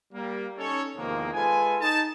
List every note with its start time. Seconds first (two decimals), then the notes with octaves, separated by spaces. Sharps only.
0.14 G3 A#3
0.59 C#4 D#4 A4 C#5
0.97 E2 C3 D#3 F3 G#3 A#3
1.34 G#3 F4 A4 B4 G#5
1.81 D#4 A5